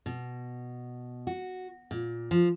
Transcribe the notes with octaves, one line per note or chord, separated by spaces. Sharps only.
B2
F#4
A#2
F3